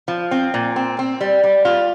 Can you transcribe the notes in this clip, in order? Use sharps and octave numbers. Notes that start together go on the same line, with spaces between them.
F3
C4
A#2
C4
C4
G3
G3
F4